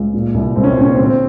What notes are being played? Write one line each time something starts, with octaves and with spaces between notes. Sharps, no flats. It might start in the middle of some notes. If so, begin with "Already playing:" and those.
Already playing: C#2
A#2
C2
C2 C4
C#4
C4
A#2 C#4
C4
C#4
D3
C4